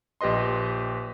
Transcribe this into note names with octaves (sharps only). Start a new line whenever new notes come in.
A#1 G4 B4 D#5 C6